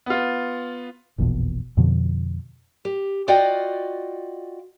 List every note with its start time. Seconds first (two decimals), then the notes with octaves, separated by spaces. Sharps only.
0.06 B3 F4
1.18 F1 A#1 E2 B2
1.77 F2 B2 D3 F3
2.85 G4
3.28 F4 F#4 D5 D#5 F5 G5